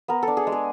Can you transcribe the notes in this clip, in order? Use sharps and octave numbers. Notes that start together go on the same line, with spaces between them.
B3 A#4
D4 A4
G#4
G#3
G#4